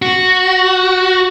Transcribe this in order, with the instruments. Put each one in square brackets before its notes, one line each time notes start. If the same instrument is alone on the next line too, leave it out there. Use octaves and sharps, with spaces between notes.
[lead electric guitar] F#4